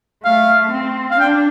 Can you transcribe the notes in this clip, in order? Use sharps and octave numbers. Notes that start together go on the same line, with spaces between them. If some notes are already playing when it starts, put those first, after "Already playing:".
A3 F5
C4
F5
D4 G5